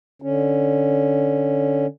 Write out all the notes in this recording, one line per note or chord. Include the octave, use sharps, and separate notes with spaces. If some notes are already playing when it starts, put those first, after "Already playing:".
D3 C#4